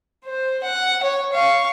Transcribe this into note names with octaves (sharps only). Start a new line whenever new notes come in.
C5
F#5
C#5
F5 C#6